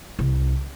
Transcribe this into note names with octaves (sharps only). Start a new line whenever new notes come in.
C2